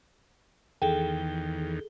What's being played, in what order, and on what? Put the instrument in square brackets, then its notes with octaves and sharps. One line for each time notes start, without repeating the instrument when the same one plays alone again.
[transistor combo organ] E2 D#3 [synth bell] G#4 A4 G7 [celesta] G5